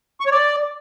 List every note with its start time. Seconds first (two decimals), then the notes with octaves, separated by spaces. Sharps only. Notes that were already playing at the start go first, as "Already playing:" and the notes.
0.21 C#6
0.26 C#5
0.32 D5